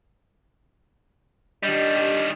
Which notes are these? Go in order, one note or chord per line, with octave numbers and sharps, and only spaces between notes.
D#3 G3 D4 G4 D#5